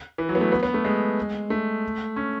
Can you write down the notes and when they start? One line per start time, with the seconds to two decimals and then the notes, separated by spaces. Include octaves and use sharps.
0.18 E3
0.29 F#3
0.35 B3
0.41 A3
0.52 B3
0.63 B3
0.74 A3
0.85 G#3
1.50 A3
2.16 C#4